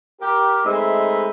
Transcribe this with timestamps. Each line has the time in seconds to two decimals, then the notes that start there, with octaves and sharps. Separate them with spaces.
0.19 G4 A#4
0.64 G#3 A3 C4 D#4 B4 E5